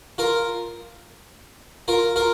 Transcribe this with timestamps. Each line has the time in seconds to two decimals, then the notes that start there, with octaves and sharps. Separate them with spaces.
0.18 F4 A#4
1.88 F4 A#4
2.16 F4 A#4